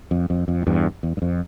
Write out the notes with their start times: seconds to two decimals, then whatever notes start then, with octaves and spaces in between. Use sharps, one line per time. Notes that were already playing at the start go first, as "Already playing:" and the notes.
0.11 F2
0.30 F2
0.48 F2
0.62 A2
0.67 E2 G2
1.03 E2
1.17 G2
1.22 F2